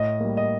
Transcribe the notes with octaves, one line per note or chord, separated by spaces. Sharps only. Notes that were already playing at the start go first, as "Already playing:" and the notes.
Already playing: A2 D#5
G3 A#3
D#5